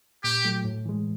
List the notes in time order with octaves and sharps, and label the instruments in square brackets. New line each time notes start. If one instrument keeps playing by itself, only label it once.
[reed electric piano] A#2 [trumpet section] G4
[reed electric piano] F#3 A3
A2
E3 G#3